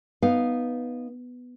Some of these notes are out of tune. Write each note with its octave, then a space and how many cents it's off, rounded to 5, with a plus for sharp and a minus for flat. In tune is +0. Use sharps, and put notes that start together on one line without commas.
B3 +0 D#4 +0 F5 +5